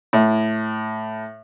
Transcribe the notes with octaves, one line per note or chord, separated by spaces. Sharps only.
A2